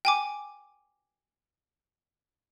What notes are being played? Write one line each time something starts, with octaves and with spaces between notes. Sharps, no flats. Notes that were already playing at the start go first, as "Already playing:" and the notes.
G5 G#5 D6